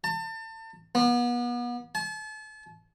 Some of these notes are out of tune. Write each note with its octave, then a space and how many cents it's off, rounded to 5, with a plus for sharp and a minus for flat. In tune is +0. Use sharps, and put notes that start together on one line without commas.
A5 +35
B3 -35
A5 -35